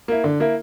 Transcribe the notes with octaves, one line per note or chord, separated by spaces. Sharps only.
A#3 E4
D3
A#3 E4